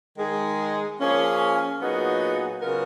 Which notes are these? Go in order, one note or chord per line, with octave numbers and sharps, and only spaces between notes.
D#3 G#3 D#4 G#4
F3 A#3 C#4 G#4
A#2 F#3 B3 D#4 G#4
C#3 F#3 B3 F4 A#4